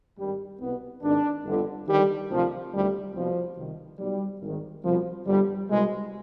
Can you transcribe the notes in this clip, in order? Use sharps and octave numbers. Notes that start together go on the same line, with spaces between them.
G#1 G2 D#3 G3
C2 B2 B3
G#1 G#2 D#3 D4
G1 F2 D3
D#2 D3 G3
D2 C3 D#3 F3
D2 C3 D#3 G3
C2 B2 F3
C2 C3 D#3
B1 B2 G3
G#1 G#2 D#3
C2 B2 F3
G1 G2 D3 G3
C2 B2 G#3